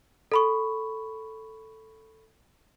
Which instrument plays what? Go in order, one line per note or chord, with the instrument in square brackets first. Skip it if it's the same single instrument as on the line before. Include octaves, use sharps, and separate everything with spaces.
[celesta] A4 B5 C#6